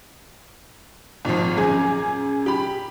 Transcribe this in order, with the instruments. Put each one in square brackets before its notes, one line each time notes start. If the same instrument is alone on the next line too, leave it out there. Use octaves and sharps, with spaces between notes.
[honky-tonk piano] G#1 F3 [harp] A#2
[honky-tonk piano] F#2 G#4 G#5 [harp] D6 G6 A#6
[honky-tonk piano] G4 B5